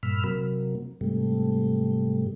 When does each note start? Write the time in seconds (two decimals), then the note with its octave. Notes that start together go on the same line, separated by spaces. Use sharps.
0.03 G2 A#2 B5 E6 F6
0.24 C3 F#3 A#3
1.01 G#2 C3 G3 A3